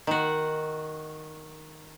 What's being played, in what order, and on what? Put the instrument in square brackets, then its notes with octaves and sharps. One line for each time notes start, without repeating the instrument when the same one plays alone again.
[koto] D#3 F#4